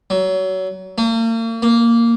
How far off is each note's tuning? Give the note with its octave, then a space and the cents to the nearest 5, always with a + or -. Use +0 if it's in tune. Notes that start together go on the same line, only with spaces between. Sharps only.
F#3 +25
A#3 -40
A#3 -5